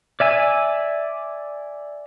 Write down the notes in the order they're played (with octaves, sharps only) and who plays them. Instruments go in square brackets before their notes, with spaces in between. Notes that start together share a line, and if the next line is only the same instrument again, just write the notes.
[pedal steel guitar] D5 E5 G#5 E6